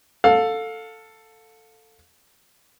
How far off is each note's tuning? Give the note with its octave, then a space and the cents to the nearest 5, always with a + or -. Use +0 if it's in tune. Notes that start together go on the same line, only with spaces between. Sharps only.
A4 +10 F5 +25